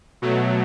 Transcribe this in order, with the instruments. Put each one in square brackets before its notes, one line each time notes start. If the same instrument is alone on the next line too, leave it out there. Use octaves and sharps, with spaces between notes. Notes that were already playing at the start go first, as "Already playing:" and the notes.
[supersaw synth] B2 F#3 A3